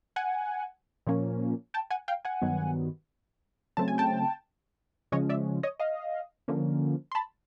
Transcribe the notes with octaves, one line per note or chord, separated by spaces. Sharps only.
F#5 G#5
A#2 F3 A#3 C#4
G5 A5
F#5 G#5
F5 G5
F#5 G#5
G2 D#3 F#3 B3
C#3 F#3 A3 C4 A5
G#5
G5 A5
C#3 F3 G#3 C#4 C#5 D#5
D5 E5
C#5 D#5
D#5 F5
D3 F3 A#3 C#4
C6
A5 B5